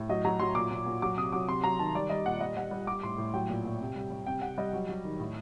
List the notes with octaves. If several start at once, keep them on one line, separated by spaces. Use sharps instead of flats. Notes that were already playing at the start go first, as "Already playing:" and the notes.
Already playing: A2
F#3 D#5
F#3 A#5
F#3 C6
A#2 D6
A#2
A#2
F#3 D6
C3 D#6
F#3 D6
C3 C6
F#3 A#5
D#3 A5
G3 D5
G3 D#5
A#2 F#5
G3 D#5
G3 F#5
G3
G3 D6
A2 C6
A2
F#3 G5
A#2
A#2
C3
G3
G3
C3 G5
C3 F#5
G3 D#5
F#3
F#3
D#3
A2